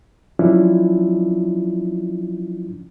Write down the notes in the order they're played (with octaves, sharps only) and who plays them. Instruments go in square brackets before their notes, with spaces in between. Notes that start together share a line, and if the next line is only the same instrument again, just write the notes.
[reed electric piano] F3 F#3 C#4 D4 E4 F4